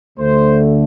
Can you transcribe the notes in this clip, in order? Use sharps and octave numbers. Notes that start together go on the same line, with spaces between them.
D2 D3 A3 C5